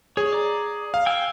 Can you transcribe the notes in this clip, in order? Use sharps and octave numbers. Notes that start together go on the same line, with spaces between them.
G#4 C#5
D5 A#5
F5
G5 G#5 E6